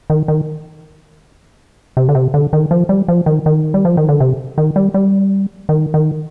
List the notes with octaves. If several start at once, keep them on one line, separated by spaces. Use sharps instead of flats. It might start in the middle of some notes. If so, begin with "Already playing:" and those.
D#3
D#3
C3
D3
C3
D3
D#3
F3
G3
F3
D#3
D#3
G3
F3
D#3
D3
C3
D#3
G3
G3
D#3
D#3